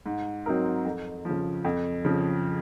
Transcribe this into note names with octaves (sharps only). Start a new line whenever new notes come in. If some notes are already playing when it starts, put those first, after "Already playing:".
G#2
F#3 C4 D#4 A#4
F2
C#3 F3
F2
C#3 F3